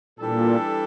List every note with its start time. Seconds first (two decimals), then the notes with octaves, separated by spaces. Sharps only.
0.19 A#2 E3 G3 D4 A4